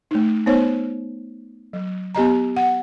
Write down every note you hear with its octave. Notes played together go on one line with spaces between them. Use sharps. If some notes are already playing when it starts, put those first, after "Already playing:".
A3 D#4
B3 D#4 C5 C#5
F#3
B3 G4 D#5 A#5
F#5